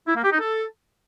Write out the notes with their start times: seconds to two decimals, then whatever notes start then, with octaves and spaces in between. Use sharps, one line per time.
0.07 E4
0.15 A#3
0.24 G4
0.32 D#4
0.40 A4